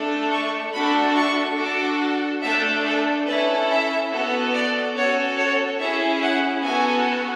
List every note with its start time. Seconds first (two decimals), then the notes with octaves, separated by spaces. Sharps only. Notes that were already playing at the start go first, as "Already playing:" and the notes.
Already playing: A3 D4 A4
0.32 C#6
0.74 A3 D4 F#4 A4 B5
1.16 C#6
1.59 D4 F#4 A4 D6
2.42 A3 D4 A4 E5
2.85 A4
3.26 C#4 E4 A4 B4
3.69 E5
4.11 B3 F#4 A4
4.53 D5
4.95 C#4 F#4 A4 C#5
5.37 C#5
5.80 C#4 E4 G#4 E5
6.22 F#5
6.63 B3 F#4 A4 G#5